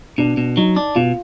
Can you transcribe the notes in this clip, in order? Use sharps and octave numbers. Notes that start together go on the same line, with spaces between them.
B2 D4
B2
F#3 D#4
D4
B2 F4